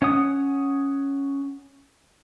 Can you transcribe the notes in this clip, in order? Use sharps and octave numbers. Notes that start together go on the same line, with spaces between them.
C#4 C#5 F#5 D#6